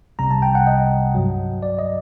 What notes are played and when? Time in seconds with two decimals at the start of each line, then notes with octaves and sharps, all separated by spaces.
0.19 C2 C3 G3 A#5
0.31 A5
0.42 G5
0.55 F#5
0.67 D#5
1.15 G2 F#3
1.63 D5
1.79 D#5